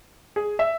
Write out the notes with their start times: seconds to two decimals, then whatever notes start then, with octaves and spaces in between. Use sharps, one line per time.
0.36 G#4
0.59 E5